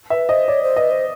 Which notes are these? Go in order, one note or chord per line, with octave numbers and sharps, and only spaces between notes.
B4 E5
C5 D#5
C#5 D5
C5
B4 D#5
C5